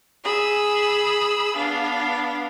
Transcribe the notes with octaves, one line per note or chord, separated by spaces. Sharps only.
G#4 B5 E6
B3 D4 F5